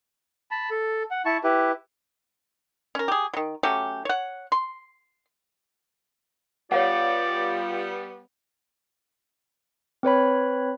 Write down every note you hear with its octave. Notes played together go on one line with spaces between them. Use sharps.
A5 B5
A4
F#5
E4 A5 C#6
E4 G4 B4
C#4 A#4
G4 G#4
D#3 F#3
F#3 A3 C#4 G4
C#5 F#5
C6
G3 B3 F4 C#5 D5 F5 F#5
C4 B4 C#5 B5